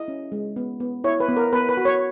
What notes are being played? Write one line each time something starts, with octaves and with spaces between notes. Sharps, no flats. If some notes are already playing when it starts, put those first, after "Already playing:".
Already playing: E4 D#5
C#4
G#3
B3
B3
E4 C#5
B4
B3
A#4
B3 B4
B4
F#4
C#5